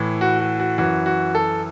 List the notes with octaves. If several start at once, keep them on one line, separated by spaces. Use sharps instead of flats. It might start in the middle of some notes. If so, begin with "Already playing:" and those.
Already playing: A2 E3
F#4
F#4
F#4
F#2 E3 F#4
F#4
A4